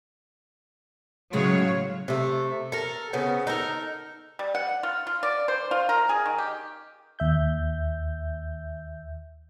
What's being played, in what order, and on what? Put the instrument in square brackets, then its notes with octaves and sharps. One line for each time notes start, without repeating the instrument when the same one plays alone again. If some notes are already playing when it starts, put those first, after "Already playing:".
[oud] A2 C#3 G#3 [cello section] F#3 C#5 F5
[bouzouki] C3 A3
A4 A#4
C#3 B3 C4
D#4 A4 A#4
[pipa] G3
F#5
F4
F4
D5
C5
F4
A#4
G#4
D#3
G4
[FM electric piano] D#2 E5 G6